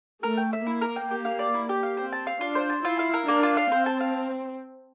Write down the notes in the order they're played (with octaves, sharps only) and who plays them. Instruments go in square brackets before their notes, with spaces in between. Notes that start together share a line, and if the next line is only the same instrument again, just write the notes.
[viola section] A3 [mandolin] A#4
[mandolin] G5
E5
[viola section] A#3 [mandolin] E4
[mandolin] A#4
G5
G4
F5
D5
E4
G4
F5
[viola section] C4 [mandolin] C5
[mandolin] A5
F5
[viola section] D4 [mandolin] F4
[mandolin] C5
A5
[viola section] E4 [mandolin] F4
[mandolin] F5
A#4
[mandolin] A#3 [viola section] D4
[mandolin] F4
F5
[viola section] C4 [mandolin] C5
[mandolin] A5
F5